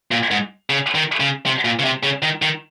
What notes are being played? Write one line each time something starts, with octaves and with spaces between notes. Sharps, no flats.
A#2
G#2
C#3
D#3
C#3
C3
A#2
C#3
C3
C#3
D#3
D#3